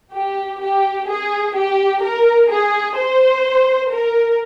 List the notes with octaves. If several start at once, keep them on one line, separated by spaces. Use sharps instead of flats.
G4
G4
G#4
G4
A#4
G#4
C5
A#4